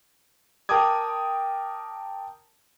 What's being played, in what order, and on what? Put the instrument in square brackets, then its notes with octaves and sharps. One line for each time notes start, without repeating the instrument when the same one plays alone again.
[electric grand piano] A#4 G5 A5 D6 D#6 G#6